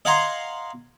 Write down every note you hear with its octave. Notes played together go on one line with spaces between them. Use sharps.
D#5 F5 F#5 G#5 A#5 C6